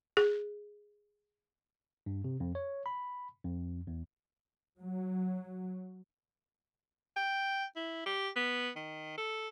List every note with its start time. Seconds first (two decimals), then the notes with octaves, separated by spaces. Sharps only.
0.17 G#4
2.06 G2
2.24 C3
2.40 F2
2.55 C#5
2.86 B5
3.45 F2
3.87 E2
4.80 F#3
7.17 G5
7.76 E4
8.06 G4
8.36 B3
8.76 D#3
9.18 A4